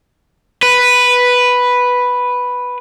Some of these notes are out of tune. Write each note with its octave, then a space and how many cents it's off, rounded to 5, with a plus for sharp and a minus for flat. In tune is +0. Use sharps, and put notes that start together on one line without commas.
B4 +0